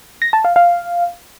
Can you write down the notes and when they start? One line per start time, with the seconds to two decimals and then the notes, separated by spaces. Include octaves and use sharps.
0.22 A#6
0.33 A5
0.45 F5
0.56 F5